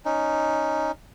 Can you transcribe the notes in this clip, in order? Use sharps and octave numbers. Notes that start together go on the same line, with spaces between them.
C#4 D#4